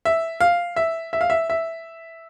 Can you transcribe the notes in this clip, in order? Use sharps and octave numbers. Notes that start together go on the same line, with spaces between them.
E5
F5
E5
E5
F5
E5
E5